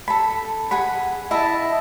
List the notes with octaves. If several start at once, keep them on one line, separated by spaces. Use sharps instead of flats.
A4 B5
G#4 F#5 B5
E4 D#5 E5 A5